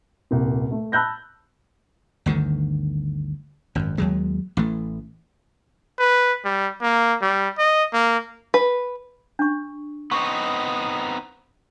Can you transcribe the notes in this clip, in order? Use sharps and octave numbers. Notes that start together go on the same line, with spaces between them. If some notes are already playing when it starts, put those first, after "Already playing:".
D#1 C2
A3
A5 B5 E6 F#6 G6 A#6
G1 D2 D3 D#3
G#1 F#2
D#2 F#3 G#3
A1 E3 A3
B4
G3
A#3
G3
D#5
A#3
B4
D4 C#6
B3 C4 D#4 C6 C#6